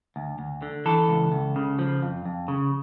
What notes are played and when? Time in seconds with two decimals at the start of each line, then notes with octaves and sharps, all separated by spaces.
0.16 D2
0.39 D2
0.62 D3
0.86 E3 A4
1.09 C#2
1.32 C#2
1.56 C#3
1.79 F3
2.02 F2
2.26 F2
2.48 C#3